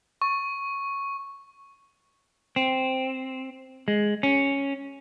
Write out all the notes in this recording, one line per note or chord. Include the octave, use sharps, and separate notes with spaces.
C#6
C4
G#3
C#4